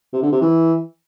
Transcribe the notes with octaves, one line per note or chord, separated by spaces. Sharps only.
C3
D3
C3
E3